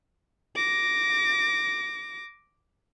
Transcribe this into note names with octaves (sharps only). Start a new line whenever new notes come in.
D6 A#6